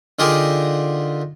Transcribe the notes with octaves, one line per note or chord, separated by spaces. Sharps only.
D3 D#4 F4 G4 G#4 A#4